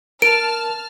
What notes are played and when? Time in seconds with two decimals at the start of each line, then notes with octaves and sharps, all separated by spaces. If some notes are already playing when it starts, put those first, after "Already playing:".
0.22 A#4 A5 F6 D7